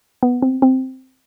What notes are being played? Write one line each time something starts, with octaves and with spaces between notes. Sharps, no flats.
B3
C4
C4